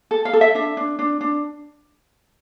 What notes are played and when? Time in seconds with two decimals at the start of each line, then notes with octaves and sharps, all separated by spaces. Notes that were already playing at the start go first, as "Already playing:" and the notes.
0.11 A4
0.25 F5
0.33 A4
0.41 E5
0.55 D4 E5
0.77 D4
0.99 D4
1.21 D4